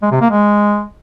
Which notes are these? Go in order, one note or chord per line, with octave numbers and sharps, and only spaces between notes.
G#3
C3
A#3
G#3